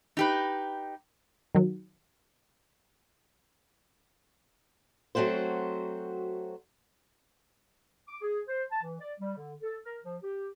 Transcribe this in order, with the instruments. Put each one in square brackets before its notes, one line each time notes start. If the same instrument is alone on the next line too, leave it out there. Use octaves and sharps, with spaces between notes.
[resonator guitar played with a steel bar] D#4 G4 B4
[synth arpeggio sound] D#3 F#3
[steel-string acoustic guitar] F#3 A3 C4 F#4 C5
[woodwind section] D6
G#4
C5
A5
E3
D5
G3
D3
A4
A#4
F3
G4